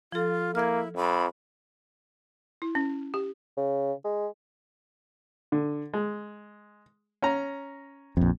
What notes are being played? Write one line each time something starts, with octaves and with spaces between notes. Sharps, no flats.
F3 F4 A4
A#3 E4 F6 G#6
F2 B5
E4
C#4
G4
C#3
G#3
D3
G#3
C#4 A#5
A#1 F2